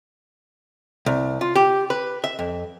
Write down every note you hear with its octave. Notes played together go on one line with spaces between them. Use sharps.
C2
F4
G4
B4
E5
F2